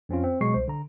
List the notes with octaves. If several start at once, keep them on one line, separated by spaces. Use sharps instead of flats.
F2 C4 C#4 F4
C4
B2 F#3 G#3 D#5 C#6 C7
C2 C5
D3 A#5